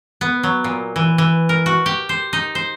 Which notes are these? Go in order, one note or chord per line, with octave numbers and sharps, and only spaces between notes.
B3
F#3
A#2
E3
E3
A#4
F#4
G4
C5
D#4
C5